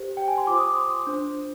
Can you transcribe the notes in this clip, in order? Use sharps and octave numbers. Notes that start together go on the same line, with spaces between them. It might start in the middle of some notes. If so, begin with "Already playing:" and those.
Already playing: G4 C5
G5
G#5
C6
F4 C5 D6
D#6
C6
D4 F4 C5